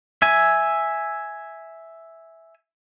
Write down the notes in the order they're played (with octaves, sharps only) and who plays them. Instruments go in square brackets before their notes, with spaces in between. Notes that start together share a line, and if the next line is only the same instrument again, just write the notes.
[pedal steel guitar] E5 G#5